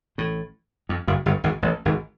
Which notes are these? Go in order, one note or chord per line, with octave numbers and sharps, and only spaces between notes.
A1 A2
F2
F#1 F#2
G1 G2
G#1 G#2
A1 A2
G#1 G#2